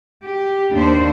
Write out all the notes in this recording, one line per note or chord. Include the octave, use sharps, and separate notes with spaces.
G4
D#2 D4 C5